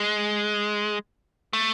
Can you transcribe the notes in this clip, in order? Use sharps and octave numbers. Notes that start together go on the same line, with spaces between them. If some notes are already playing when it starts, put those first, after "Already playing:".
Already playing: G#3
A3